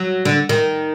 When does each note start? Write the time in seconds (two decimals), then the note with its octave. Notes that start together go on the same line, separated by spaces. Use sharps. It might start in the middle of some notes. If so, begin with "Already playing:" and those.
Already playing: F#3
0.25 D3
0.49 D#3